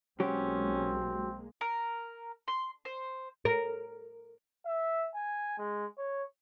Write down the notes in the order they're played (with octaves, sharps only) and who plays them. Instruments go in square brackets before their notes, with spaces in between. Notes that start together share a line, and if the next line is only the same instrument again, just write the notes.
[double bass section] B1 G#3 A#3 [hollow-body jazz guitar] F#3 G4 [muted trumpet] C4 [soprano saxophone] C#4
[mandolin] A#4
C6
C5
[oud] A#4
[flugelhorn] E5
G#5
G#3
C#5